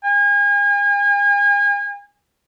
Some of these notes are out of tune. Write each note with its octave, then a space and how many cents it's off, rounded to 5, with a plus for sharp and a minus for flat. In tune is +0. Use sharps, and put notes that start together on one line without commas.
G#5 -35